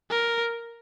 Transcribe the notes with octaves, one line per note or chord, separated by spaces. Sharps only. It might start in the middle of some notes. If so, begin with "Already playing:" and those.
A#4